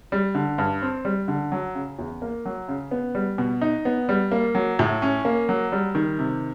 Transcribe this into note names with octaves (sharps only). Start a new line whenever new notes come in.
G3
D3
G2
C4
G3
D3
F#3
C#3
E2
A#3
F#3
C#3
B3
G3
B2
D#4
B3
G3
A#3
F#3
A2
C#4
A#3
F#3
G3
D#3
C3